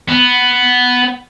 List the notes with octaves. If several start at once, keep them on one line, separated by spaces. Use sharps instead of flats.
B3